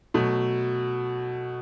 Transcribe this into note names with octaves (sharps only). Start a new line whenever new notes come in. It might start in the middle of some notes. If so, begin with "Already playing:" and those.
B2 F#3 A3